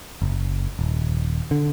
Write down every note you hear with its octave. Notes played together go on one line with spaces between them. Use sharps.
F#1
D#1
D3